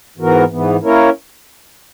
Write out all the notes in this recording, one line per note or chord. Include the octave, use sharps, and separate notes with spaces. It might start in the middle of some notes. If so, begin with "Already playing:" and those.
G#2 E3 B3 F#4 A#4
G#2 E3 B3
A#3 C#4 E4 A#4 C#5